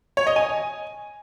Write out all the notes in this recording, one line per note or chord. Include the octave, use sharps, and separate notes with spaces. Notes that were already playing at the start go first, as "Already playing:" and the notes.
C#5
D#5
G#5